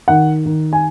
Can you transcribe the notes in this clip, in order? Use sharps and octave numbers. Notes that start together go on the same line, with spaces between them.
D#3 F#5
D#3
G#5